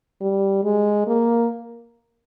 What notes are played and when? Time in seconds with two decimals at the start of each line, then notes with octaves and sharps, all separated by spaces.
0.21 G3
0.64 G#3
1.07 A#3